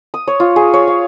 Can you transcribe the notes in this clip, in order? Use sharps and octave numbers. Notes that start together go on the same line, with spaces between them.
D#6
C#5
F4
G#4
C#5
F5